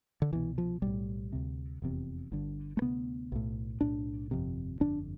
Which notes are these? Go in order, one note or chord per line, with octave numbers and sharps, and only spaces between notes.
D3
C2 B2 E3
F3
B1 A2 G3
D2 C3
F1 E2 C3
G1 G2 D3
A3
D2 C3 B3
B1 A2
B1 A2 D4
G1 F2 C3
G1 F2 D3 D4